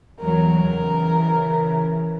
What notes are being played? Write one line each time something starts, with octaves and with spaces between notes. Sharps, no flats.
E2 F#3 A#4
C#3 E3